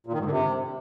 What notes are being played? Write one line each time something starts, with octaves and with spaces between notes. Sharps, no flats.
A#2
D#3
G#2
D3
C3